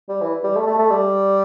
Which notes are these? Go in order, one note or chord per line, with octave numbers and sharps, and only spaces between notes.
G3
E3
G3
A3
A3
A3
G3